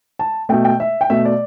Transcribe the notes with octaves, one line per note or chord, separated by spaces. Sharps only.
A5
B2 A3 G5
G5
E5
G5
B2 A3 E5
D5